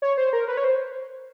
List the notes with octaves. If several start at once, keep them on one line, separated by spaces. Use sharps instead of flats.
C#5
C5
A#4
B4
C#5
C5